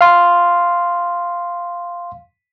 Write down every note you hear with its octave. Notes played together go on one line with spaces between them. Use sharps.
F5 C6